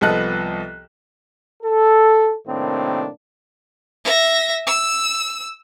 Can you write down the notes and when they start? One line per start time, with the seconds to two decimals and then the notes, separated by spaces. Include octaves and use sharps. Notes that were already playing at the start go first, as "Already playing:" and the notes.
0.01 C2 F3 B3 A4 D#5 F#6
1.63 A4
2.47 A2 C3 D#3 A#3 C4 D4
4.05 E5 A#6
4.67 E6